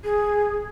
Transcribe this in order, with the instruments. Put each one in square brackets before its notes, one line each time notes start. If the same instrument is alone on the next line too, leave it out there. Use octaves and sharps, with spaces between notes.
[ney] G#4